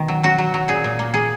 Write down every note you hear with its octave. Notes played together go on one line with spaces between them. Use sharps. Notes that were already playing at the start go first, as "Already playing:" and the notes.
Already playing: B2 D#3
F#3
F#3 F#4
F#3
F#3
A#2 G#4
A#2
A#3
A#3 G#4